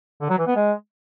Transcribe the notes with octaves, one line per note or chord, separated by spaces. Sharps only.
D3
F#3
E3
B3
G#3